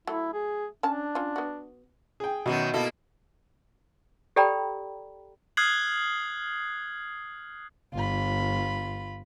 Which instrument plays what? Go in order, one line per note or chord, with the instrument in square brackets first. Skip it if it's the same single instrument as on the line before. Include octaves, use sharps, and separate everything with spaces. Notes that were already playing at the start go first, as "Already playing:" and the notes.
[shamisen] F#3 A3 [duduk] E4
[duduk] G#4
[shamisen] C#4 A5 [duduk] D4
[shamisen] C#4 F4
B3 F#4
[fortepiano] G#4 G5
[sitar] F#2 D#3 F#3 [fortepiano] B2
[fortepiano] B2 [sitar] A#3 E4 A4
[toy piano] G4 A4 D5 G5 A#5 B5
[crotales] D#6 F6 F#6 G#6 C7 F#7
[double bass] G1 [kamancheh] F4 B5